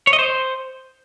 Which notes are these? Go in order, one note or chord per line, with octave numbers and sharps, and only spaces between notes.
C#5
D#5
C5